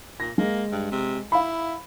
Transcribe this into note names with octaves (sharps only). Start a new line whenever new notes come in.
A#2 A#6
G#3 A#3
G2
C3
E4 F5 B5